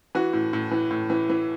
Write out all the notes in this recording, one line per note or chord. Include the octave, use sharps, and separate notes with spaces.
E3 F#4
A2
A2
E3
A2
E3
E3